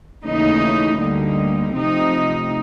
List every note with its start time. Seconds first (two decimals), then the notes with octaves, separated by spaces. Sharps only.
0.24 D#2 C#3 E3 A3 D#4
0.99 D2 D3 G3 A#3 D#4
1.75 C3 F3 A3 C4 D#4